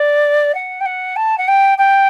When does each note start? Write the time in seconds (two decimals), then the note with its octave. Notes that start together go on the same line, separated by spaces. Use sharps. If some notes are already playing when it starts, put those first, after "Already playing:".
Already playing: D5
0.55 F#5
0.81 G5
0.86 F#5
1.16 A5
1.38 F#5
1.48 G5
1.78 G5